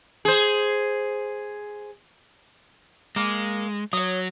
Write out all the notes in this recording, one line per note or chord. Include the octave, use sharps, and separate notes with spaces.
G#4 C5
G#3 A#3
F#3 C#5 D#6